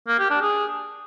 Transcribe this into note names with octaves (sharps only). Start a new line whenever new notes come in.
A#3
G4
D4
G#4